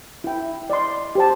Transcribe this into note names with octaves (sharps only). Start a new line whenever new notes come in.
E4 G5
D5 D#5 C6
G4 C5 A5